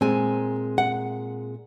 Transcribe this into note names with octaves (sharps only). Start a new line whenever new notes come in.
A#2 G#3 C4 G#5
F#5